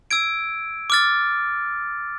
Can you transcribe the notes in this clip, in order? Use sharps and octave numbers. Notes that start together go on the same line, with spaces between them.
E6 G#6 D7
D6 F6 A6